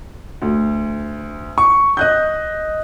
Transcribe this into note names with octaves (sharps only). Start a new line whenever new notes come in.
D2
C#6
D#5 F#6 G6